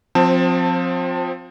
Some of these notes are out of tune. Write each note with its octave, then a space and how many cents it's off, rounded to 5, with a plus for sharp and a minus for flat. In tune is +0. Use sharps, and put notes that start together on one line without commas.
F3 +25 C4 +0 A5 +20